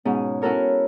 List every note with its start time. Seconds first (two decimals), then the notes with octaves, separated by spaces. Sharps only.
0.05 G#2 B2 C#4
0.42 C#4 E4 F#4 A4 A#4 C#5